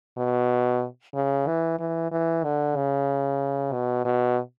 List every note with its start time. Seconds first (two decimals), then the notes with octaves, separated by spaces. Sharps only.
0.18 B2
1.15 C#3
1.47 E3
1.79 E3
2.11 E3
2.44 D3
2.76 C#3
3.73 B2
4.05 B2